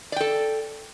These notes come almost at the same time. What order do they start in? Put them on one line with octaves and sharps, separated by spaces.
D5 G5 A4